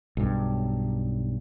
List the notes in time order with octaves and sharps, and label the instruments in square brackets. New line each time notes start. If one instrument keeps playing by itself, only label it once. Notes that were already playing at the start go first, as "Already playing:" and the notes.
[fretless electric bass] B1 G2